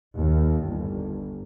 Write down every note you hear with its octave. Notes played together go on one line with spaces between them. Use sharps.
D#2
G1